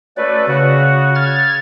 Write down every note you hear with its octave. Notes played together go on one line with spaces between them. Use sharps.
A3 C#4 F#4 B4 D5
C#3 F#4
F6 G#6 A6